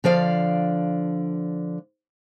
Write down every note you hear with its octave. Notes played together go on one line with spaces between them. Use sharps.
D3 F3 D5 F5